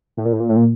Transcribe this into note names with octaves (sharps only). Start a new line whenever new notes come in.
A2
A#2
A2
A#2
A2
A#2